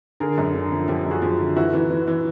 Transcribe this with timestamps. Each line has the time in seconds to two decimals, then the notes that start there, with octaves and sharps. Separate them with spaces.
0.20 D3 G#4 A#4
0.38 F#2
0.55 D3
0.72 F3
0.88 F3 G4 A4
1.05 F#2
1.11 F#4 G#4
1.22 F3
1.39 D3
1.56 E3 E4 F#4
1.73 E3
1.90 E3
2.07 E3